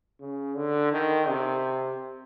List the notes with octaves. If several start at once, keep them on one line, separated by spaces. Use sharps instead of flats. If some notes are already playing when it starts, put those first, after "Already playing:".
C#3
D3
D#3
C3